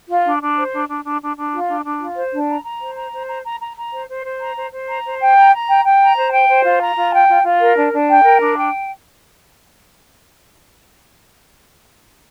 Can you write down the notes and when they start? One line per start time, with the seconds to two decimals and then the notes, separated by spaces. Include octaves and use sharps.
0.09 F4
0.25 D4
0.41 D4
0.57 C5
0.72 D4
0.88 D4
1.04 D4
1.21 D4
1.37 D4
1.53 F4
1.68 D4
1.84 D4
2.00 F4
2.17 C5
2.32 D4
2.48 A#5
2.65 A#5
2.81 C5
2.96 A#5
3.13 C5
3.29 A#5
3.44 A#5
3.61 A#5
3.77 A#5
3.93 C5
4.09 C5
4.25 C5
4.40 A#5
4.57 C5
4.72 C5
4.89 A#5
5.05 C5
5.21 G5
5.36 A#5
5.52 A#5
5.68 G5
5.84 G5
6.00 A#5
6.17 C5
6.32 G5
6.48 C5
6.65 F4
6.80 A#5
6.96 F4
7.12 G5
7.29 F4
7.45 F4
7.61 A#4
7.76 D4
7.93 D4
8.09 G5
8.24 A#4
8.40 D4
8.57 G5